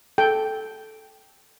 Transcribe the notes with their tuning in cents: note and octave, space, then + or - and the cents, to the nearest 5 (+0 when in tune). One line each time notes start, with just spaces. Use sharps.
A4 -10 G5 +0